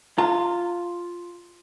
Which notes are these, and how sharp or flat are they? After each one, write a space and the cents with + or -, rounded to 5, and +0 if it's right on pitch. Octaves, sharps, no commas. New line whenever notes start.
F4 +0 A#5 -40